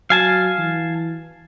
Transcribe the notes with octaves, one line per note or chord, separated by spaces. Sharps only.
F#3 F5 G#5 A5
E3